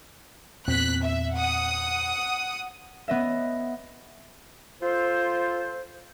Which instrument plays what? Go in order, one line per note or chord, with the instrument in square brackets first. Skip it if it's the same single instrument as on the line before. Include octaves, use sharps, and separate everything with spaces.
[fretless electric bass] E2 A#2 C4 [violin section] F#6 B6
[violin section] E5
F#5 D#6
[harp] B3 D#5 E5
[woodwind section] F4 A4 C5